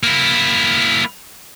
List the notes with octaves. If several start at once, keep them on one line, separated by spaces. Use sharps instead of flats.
A#3 E4